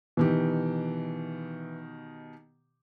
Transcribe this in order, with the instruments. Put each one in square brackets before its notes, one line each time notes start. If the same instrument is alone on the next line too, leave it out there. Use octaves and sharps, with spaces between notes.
[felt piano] B2 D#3 G4 [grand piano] E3